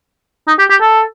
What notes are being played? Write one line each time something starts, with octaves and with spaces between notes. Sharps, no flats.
D#4
G4
G4
A4